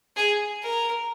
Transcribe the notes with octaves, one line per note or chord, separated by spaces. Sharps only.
G#4
A#4